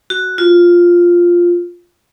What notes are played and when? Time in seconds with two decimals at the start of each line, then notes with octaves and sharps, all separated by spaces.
0.10 F#4
0.38 F4